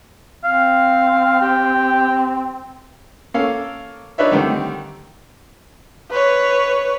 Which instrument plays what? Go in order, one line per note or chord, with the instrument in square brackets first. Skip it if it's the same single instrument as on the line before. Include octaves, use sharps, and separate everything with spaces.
[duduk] C4 [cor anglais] F5
[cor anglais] G4
[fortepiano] A#3 C#4 A4 F5
D4 D#4 B4 C#5 E5
D3 D#3 G3 A3 C4
[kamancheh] B4 C#5